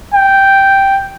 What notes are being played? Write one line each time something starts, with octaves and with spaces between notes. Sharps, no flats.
G5